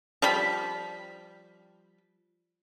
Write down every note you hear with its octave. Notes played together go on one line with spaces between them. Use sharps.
F3 G3 B5